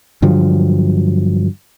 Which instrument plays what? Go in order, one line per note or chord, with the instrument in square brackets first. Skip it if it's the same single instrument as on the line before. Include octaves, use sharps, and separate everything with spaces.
[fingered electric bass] G2 D3 F3 F#3